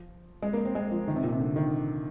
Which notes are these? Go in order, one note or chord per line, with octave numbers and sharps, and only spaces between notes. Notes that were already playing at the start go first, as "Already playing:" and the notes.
Already playing: F3
G#3
A#3
C4
G#3
F3
D#3
C3
A#2
C3
D3
D#3